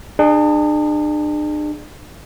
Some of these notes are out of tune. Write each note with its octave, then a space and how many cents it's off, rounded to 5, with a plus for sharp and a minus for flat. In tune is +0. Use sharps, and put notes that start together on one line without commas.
D4 +40 G#4 -15